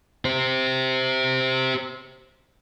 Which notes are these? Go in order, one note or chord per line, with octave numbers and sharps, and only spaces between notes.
G4 C5